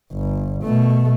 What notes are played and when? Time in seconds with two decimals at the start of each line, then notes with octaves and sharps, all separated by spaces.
0.13 G1
0.64 B2 A3